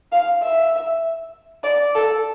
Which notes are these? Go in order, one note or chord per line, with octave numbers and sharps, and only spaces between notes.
F5
E5
D5
A4